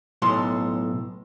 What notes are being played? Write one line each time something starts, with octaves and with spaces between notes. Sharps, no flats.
B1 A2 C6